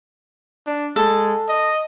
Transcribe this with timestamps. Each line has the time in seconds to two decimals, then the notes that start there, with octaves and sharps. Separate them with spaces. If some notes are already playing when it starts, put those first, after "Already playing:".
0.67 D4
0.96 G#3 A4
1.48 D#5